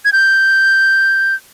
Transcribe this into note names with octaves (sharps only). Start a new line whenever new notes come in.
G#6
G6